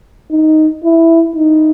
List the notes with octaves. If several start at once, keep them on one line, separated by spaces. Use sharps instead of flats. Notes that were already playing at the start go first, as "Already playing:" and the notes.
D#4
E4
D#4